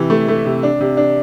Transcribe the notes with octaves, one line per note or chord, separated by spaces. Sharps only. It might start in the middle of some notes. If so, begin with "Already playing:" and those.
Already playing: C3 E3
A3
A3
C3
D4
C3
D4